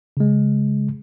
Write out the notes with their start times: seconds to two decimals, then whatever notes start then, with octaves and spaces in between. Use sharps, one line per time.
0.17 C#3 G#3